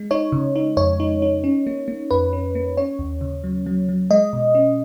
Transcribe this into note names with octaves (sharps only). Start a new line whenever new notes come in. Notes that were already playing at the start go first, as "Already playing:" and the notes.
Already playing: G#3
D#4 C#5
C#3
D#4
F2 C#5
D#4
D#4
C#4
A#3
A#3
F2 B4
C#4
A#3
C#4 C#5
D#2
C#3
F#3
F#3
F#3
G#3 D#5
B2
C#4